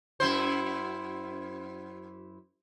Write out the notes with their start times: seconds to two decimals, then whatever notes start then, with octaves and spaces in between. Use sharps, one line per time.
0.20 F#2 E4 C5